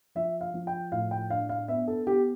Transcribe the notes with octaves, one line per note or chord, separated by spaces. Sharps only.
F3 E5
F5
F3
G5
A2 F5
G5
D4 F5
F5
B3 E5
A4
B3 G4